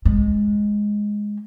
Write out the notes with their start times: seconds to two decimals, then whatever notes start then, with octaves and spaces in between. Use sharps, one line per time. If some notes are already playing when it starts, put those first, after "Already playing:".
0.05 G#3